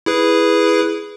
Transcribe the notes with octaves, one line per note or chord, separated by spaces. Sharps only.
E4 G#4 B4